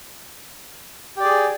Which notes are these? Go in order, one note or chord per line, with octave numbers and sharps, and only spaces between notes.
G4 G#4 D5